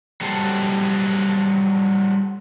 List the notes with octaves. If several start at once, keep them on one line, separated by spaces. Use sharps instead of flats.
F#3 G3 A4 C5